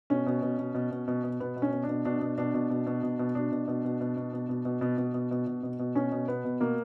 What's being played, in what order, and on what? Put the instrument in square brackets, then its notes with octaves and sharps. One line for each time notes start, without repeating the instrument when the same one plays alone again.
[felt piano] B2 C#4
B2
B2
B2
B2
B2
B2
B2
B2 B3
B2
C#4
B2
D4
B2
B2 D4
B2
B2 D4
B2
B2
B2
B2
B2
B2 D4
B2
B2
B2
B2
B2
B2
B2
B2
B2
B2
B2
B2
B2
B2
B2
B2 C#4
B2
B2 B3
B2
B2 A#3